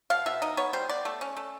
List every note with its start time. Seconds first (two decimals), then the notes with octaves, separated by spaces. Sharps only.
0.10 B2 F5
0.26 B2 E5
0.42 D#4 D#5
0.57 B3 C#5
0.73 G3 C5
0.89 B3 D5
1.05 A3
1.21 C#4
1.37 A3